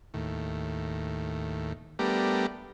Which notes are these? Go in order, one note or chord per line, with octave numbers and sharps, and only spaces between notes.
D#2 A2
G3 A3 B3 D4 G4 A#4